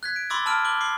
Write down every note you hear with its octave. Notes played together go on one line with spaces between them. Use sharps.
F#6 G#6 B6
D7
B5 C6 D6 E6 A6
A5 B5 E6 F6 D7
D6 F#6 F#7 G7
D6 C7 F#7